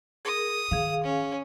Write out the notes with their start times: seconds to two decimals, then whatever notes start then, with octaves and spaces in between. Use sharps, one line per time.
0.25 G#4 A#4 D#6
0.71 D#3 G#4 F5
1.04 C#4